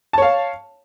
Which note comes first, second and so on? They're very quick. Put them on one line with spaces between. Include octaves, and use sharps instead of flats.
A5 C#5 F5